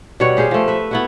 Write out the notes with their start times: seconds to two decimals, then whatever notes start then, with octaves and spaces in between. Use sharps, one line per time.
0.20 B2 G3 F#4 C#5
0.37 G4 G#4 C5 F5
0.51 F3 A3
0.68 B4 E5
0.91 B3 E4 F#4